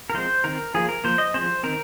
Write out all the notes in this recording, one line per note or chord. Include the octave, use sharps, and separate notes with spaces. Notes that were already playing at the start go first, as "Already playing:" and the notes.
A#4
F3 G#3 C4 C5
D#3 C4 A#4
F3 A#3 G#4
A#4
F3 A#3 C5
D#5
F3 G#3 C4 C5
D#3 C4 A#4